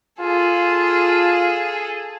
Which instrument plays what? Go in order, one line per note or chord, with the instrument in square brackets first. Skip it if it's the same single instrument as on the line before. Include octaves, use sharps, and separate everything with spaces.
[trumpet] F4 [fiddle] G#4 A4